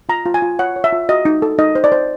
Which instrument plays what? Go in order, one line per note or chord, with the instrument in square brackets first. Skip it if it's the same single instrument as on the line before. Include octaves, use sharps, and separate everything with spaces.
[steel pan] F4 A#5
F4
G#5
F4
C#5 F#5
C#5
E5
F4
F#4 D#5
D#4
A4
D#4 D#5
C5
D5
C5